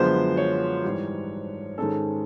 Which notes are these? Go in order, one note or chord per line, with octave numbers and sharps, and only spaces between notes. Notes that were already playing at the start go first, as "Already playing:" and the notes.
Already playing: F#2 D3 F3 G#3 B3 C5
C#5
G#2 E3 G3
G#2 D#3 G#3 C#4 A4